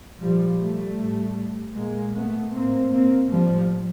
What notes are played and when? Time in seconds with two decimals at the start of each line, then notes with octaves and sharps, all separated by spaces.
0.21 A#2 F3 G3
0.60 G3 A3
0.99 A2
1.76 A#2 G#3 A#3
2.15 A3 B3
2.53 A2 A#3 C4
2.92 A#3 C4
3.30 A2 F3 G3